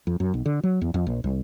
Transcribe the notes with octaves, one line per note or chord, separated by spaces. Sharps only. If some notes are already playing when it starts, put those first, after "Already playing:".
F2
F#2
B1
D3
F#3
E2
F2
A#1
C2